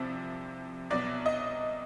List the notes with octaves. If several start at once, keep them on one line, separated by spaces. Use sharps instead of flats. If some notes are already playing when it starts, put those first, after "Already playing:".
Already playing: C2 C3 F3
C2 B2 F#3 D5
D#5